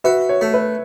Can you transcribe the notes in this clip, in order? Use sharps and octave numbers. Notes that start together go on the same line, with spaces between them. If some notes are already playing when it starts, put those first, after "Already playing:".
F#4 B4 E5
C#5
A3
B4 E5